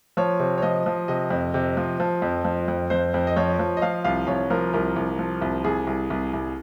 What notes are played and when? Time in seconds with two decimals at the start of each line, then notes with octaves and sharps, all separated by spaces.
0.17 F3 C#5
0.40 C3
0.58 C#5
0.62 F3 D#5
0.86 F3
1.08 C3 D#5
1.31 F2
1.54 C3
1.77 F3
2.00 F3
2.22 F2
2.45 F3
2.68 F2
2.90 F2 C5
3.14 F2
3.27 D#5
3.36 F3 C#5
3.59 F3
3.77 D#5
3.82 F3 F5
4.04 C2 F5
4.27 C2 C#5
4.50 F3 A#4
4.73 C2 A#4
4.96 C2
5.19 F3
5.42 C2
5.64 C2 G#4
5.87 C2
6.10 C2
6.33 C2